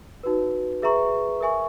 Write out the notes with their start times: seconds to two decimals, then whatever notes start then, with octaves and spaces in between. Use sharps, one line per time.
0.23 D#4 F#4 B4
0.82 G#4 B4 E5 A#5 C#6
1.41 A#4 E5 G#5 C#6